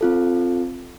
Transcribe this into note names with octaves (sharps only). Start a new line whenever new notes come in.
C4 F4 A4